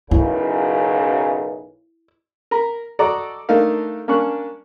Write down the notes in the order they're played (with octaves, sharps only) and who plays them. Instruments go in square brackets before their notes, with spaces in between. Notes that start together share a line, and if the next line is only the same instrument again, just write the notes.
[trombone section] B1 F#2 C#3 [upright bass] E4
[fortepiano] A#4 A#5 B5
F#4 A4 D5 D#5 A#5 D6
A3 A#3 D4 D#4 A#4 F5
A#3 C#4 D4 C#6 F#6